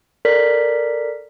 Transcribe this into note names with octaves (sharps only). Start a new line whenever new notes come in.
A4 A#4 D5 B6